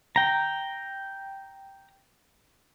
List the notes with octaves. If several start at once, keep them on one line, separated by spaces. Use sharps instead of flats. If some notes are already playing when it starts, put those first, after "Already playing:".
G5 A#5